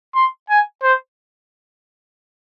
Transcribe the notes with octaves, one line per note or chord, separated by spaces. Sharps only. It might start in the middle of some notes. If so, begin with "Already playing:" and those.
C6
G#5
C5